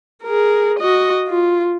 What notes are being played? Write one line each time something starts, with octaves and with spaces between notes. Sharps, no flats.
G#4 A#4
F#4 D#5
F4